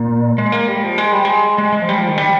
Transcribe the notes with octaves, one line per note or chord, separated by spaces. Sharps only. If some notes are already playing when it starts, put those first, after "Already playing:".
Already playing: A#2
G#3
A#3
G3
F3
G#3
G3
G#3
G#3
G#3
F3
G3
F3
D#3
G3